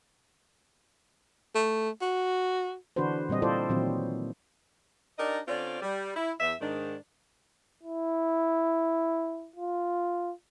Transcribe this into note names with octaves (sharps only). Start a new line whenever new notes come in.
A3
F#4
D3 E3 D4 F#4 B4 C5
A#2 G3 C4 D#5
E4 F4 A4 C5 D5
A#2 D#3 E3 F#3 C4
D4 D#4 G4 A#4 D5 D#5
D3 C4 C#4 F4 D5
G3
E4
E2 E5
G#2 D#3 D4
E4
F4